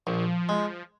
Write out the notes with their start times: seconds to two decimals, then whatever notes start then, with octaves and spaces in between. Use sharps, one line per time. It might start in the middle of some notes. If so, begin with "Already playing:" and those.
0.07 A#1 F3
0.49 G#3